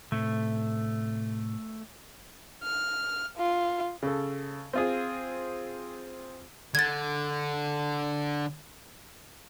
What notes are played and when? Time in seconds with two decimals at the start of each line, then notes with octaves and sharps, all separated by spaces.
0.12 A2 C3 A3
2.63 F6
3.38 F4
4.03 C#3 A4
4.73 C4 F4 G#4
6.75 D3 G#6 A6